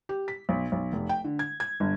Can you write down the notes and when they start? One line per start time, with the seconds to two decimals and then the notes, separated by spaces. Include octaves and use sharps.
0.09 G4
0.28 B6
0.49 B1
0.72 B1
0.92 F1
1.09 G5
1.24 D3
1.39 G#6
1.60 G#6
1.80 G1